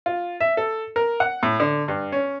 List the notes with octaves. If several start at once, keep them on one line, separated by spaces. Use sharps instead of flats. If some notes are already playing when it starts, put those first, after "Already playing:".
F4
E5
A4
A#4
F#5
A2
D3
G2
C#4